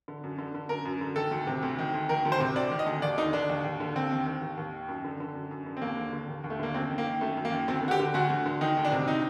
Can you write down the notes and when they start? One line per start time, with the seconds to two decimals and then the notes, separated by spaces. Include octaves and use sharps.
0.08 D3
0.24 F#2
0.38 D3
0.55 D3
0.69 F#2 A#4
0.85 F#2
1.01 D3
1.16 D#3 A4
1.31 D2
1.47 C3
1.63 D2
1.79 D#3
1.94 D2
2.09 D#3 A#4
2.25 D2
2.32 C5
2.40 C3
2.56 D2 D5
2.71 D#3
2.79 D#5
2.86 D2
3.02 D#2 D5
3.18 D3 D#4
3.33 D3 D4
3.49 D#2
3.64 D#2
3.80 D3
3.96 D#2 C4
4.11 D#3
4.26 D#3
4.42 D#2
4.57 D#2
4.73 D#3
4.88 F#2
5.04 D3
5.20 D3
5.35 F#2
5.51 F#2
5.66 D3
5.77 C4
5.82 D#2 A#3
5.97 D3
6.13 D3
6.28 D#2
6.44 D#2
6.50 A3
6.59 D3 A#3
6.74 F#2 C4
6.91 D#3
6.98 A#3
7.06 D#3
7.21 F#2 A3
7.37 F#2
7.45 A#3
7.52 D#3
7.68 D2 C4
7.83 D3 F#4
7.91 G4
7.99 D3
8.14 D2 F#4
8.30 D2
8.46 D3
8.61 D#3 D#4
8.77 D2
8.85 D4
8.92 C3
9.08 D#4